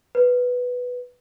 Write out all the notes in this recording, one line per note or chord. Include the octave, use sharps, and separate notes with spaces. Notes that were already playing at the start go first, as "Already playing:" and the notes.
B4